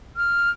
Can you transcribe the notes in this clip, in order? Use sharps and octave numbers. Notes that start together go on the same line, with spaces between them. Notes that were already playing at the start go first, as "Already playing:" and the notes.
F6